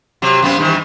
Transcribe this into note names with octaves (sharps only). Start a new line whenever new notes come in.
C3 F#3
F#2 B3 C4
G2 D#3 E3